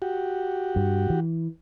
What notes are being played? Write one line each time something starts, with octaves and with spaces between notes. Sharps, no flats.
F#4 G4
G2
E3